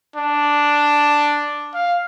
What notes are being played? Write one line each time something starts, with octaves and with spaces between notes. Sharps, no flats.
D4
F5